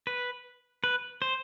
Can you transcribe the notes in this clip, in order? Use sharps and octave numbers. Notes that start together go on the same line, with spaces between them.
B4
B4
C5